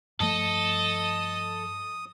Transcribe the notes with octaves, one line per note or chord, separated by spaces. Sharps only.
G2 F3 A3 A4 D#5 D#6